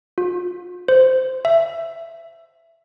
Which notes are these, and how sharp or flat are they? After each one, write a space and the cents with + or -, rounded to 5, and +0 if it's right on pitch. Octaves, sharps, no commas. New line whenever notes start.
F4 +35
C5 -15
E5 +15